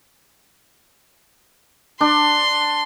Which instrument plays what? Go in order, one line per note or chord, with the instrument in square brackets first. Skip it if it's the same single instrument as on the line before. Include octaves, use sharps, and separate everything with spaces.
[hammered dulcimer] D4 [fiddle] C6